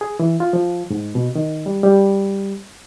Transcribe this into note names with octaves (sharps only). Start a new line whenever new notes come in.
G#4
E3
F4
F3
G#2
B2
D#3
G3
G3